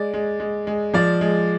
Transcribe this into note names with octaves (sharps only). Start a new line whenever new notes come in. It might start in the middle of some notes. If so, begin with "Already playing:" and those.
Already playing: G#3 D5
G#3
G#3
G#3
F3 D5
G#3